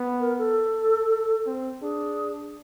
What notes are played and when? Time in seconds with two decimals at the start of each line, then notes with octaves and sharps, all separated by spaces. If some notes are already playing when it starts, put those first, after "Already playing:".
Already playing: B3
0.20 A#4
0.38 A4
1.46 C4
1.82 D4 G#4